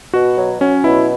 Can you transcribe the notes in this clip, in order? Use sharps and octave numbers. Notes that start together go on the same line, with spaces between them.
B2 F#4
F#3
F#3 C#4
B2 E4